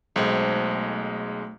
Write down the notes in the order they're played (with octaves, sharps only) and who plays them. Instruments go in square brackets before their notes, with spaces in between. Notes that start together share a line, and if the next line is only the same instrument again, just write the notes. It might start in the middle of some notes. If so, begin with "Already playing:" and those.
[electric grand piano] B1 G#3 [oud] A3 C4